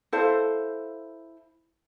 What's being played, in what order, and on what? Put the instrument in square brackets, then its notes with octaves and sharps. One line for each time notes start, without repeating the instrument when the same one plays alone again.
[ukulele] E4 A4 C5 F5